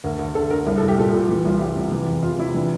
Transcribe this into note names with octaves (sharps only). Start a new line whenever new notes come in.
D2 A#4
D2
D3 A4
D3 A#4
C2 A#4
A4
C2
G4
A#2 A4
A#2
E3
C2 F4
C2 G4
C3
E3
E2
E2 F4
C3 E4
E3 D4